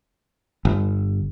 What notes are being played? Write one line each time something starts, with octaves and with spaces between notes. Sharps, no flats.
G1